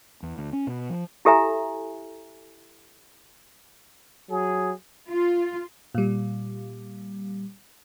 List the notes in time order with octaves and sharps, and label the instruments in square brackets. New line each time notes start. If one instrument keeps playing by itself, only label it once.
[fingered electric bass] E2
D2
C#4
B2
F3
[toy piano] E4 G4 A4 E5 G#5 A#5
[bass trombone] F#3 [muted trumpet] G#4
[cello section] F4
[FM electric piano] A#2 G3